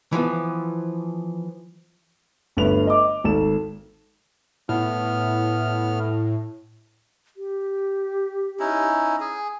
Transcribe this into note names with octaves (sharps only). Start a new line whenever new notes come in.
E3 F3 B3
G1 G2 D3 A3 B4 F7
D#5 D6
G#1 A4 E7
A2 B3 F6
G4
C#4 D#4 E4
G#4